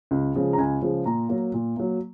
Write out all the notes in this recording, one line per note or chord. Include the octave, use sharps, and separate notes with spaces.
C#2
C#3 F3 G#3
A#5
C#2 G#5
C#3 F3 G#3
A#2 A#5
F#3 A#3
A#2
F#3 A#3